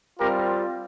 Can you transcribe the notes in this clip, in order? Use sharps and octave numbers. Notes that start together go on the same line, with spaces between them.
G3 C4 F4 G4 A#4